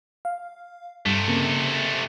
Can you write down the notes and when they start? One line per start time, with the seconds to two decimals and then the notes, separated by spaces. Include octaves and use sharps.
0.25 F5
1.06 G2 C3 A3
1.28 C#3 A#3 C4